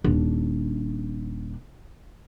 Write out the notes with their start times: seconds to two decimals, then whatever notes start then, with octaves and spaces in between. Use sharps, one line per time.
0.04 D#1 D4